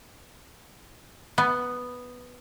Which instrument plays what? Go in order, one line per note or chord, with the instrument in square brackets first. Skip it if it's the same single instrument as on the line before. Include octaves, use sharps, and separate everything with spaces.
[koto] B3